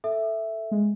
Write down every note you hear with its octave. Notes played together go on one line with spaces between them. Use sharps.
A4 E5
G#3